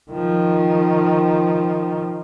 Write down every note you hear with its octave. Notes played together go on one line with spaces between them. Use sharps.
D#3 F3